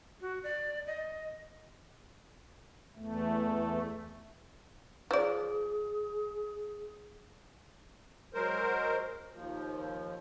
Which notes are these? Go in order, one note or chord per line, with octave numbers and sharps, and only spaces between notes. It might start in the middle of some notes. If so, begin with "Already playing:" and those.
F#4
D5
D#5
E2 A3
F3 G#4 D5
F#3 G#3 A#4 C5
D#2 F3